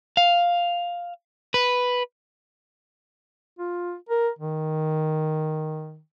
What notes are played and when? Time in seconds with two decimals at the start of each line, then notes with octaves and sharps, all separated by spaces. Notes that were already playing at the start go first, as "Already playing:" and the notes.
0.17 F5
1.54 B4
3.59 F4
4.09 A#4
4.39 D#3